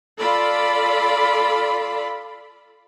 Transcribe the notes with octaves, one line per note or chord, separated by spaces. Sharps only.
F4 A4 D5 B5